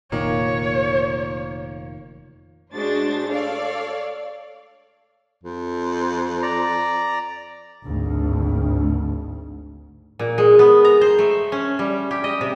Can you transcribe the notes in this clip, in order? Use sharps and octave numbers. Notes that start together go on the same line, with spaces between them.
F1 A#2 D#3 A#3 C#5
A2 G#3 D4 F#4 C5 A6
A4 C#5 D5 F5
F2
D5 A#5
G#1 D2
A#2
G#3
B3
A#5
C5
A3
C#4
G3
G4
D#5
C3